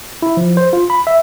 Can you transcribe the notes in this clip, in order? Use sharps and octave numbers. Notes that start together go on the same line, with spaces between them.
E4
F3
C5
F4
B5
E5